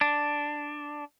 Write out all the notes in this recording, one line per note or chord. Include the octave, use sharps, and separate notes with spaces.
D4